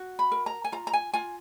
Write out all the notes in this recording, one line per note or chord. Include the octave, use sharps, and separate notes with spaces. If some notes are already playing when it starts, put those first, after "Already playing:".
Already playing: F#4
B5
A#4
A#5
G#5
F4 A#5
A#5
G#5
F4 G#5